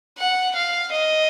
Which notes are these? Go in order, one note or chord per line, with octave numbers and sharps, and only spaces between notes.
F#5
F5
D#5